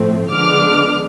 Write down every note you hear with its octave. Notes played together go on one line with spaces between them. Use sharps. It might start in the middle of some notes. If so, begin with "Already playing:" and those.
Already playing: A2 F3 A3 C4
D3 F3 G#3 B3 D4 D6 F6